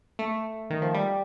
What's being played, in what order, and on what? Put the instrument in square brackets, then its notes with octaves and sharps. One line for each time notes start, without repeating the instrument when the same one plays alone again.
[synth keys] A3
D#3
F3
G3